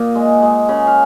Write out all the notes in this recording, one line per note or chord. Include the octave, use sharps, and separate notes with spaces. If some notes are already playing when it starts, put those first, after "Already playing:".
Already playing: A#2 A#3 D#5
G#3
G#3
C#3
F5